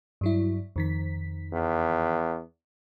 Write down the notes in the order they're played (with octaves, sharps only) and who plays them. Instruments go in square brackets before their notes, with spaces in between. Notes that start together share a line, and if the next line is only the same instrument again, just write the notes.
[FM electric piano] G2 F#3 E4
F2 D#3 B6
[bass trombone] E2